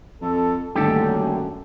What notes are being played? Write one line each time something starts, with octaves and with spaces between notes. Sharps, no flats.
F2 A4
D#1 F#2 D3 A3 G4 A4